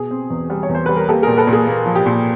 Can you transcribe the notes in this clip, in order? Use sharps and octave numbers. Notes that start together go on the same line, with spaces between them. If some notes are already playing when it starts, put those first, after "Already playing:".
Already playing: B2 G#4
C4
E2
G3
C#5
E2
C5
G3 B4
A#4
A#3 G4 A4
A#2 G#4 A#4
A4 B4
A#2
G#4 A#4
A#3
F3
G4
A#2